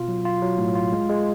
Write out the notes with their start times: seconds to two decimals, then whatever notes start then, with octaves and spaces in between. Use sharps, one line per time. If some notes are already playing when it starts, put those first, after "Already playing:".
Already playing: B2 F4
0.08 F#3
0.25 F4
0.42 F#3
0.58 A2
0.75 F4
0.93 G#3
1.09 G#3